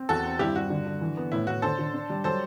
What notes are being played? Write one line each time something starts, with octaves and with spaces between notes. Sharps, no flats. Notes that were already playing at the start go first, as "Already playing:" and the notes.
Already playing: C4
E2 F#4 A4
C4
G2 E4 G4
G2 F#4
D3
D3
E3
B3
A2 E4
A2 F#4
D3 A4 C5
D3
D4
G3
F#3 A4 C5